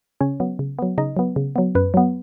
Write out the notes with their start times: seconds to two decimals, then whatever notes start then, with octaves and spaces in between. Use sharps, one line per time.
0.21 C#3 C#4 C#5
0.40 F#3 B3
0.59 C#3
0.79 F#3 B3
0.98 C#3 D#4 D#5
1.17 F#3 B3
1.36 C#3
1.56 F#3 B3
1.75 F#2 B4
1.94 F#3 B3